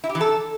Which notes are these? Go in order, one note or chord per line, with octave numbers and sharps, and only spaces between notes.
E4
G4
E3
A4